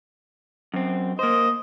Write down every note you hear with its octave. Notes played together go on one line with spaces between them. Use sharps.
F#2 C4
A#3 C5 D#5